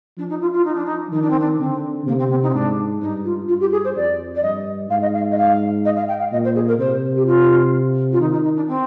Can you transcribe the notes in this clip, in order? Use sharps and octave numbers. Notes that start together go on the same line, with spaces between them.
F3 D4
D#4
F4
F4
D#4
D4
D#4
D#3 D#4
D4
C4
D4
D3 C4
C3 A#3
C4
C4
D#4
C4
G#2 D4
G2 D#4
F4
G2 F4
G4
G#4
C5
F2 D5
D5
G2 D#5
G#2 F5
D#5
F5
D#5
F5
D#5
F5
G5
F5
A#2 D#5
C5
G#4
A#4
C3 C5
G4
F4
F4
D#3 D#4
D#4
D#4
D4
C4